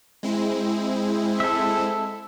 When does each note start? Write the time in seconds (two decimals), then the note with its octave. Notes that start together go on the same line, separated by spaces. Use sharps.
0.23 G#3 C4 E4
1.40 A4 E5